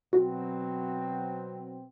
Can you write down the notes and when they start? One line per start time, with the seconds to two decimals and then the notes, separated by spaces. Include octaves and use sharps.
0.13 B2 F#3 C4 F#4